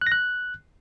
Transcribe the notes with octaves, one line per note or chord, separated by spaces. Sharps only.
F#6
A#6
F#6